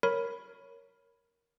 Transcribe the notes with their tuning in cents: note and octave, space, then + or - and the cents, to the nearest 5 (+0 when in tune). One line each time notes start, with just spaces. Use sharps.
A#4 +0 C#5 +0 B5 +0